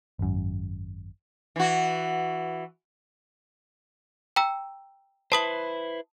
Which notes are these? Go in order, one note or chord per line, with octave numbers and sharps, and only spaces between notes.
G#1 F#2
E3 F#4
G5 A#5 E6
E4 B4 C5 A5 D#6 F#7